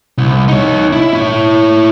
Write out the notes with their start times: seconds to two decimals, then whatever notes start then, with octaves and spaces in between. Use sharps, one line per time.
0.18 C2
0.48 D#4 C#5
0.93 E4
1.13 E4 C#5